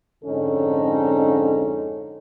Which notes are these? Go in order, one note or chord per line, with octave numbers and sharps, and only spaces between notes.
F2 G#2 D3 C#4 D#4 A4